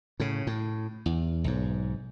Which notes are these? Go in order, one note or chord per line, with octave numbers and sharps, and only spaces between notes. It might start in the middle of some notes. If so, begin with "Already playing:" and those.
A2 C#3
A2
E2
B1 G#2